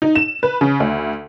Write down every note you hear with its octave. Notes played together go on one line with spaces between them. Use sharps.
D#4
E7
B4
C#3
D2